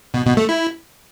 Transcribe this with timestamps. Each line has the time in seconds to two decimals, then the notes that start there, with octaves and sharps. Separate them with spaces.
0.14 B2
0.26 B2
0.37 A3
0.49 E4